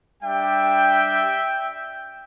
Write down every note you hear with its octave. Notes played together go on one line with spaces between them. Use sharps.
G3 D4 G4 E5 G5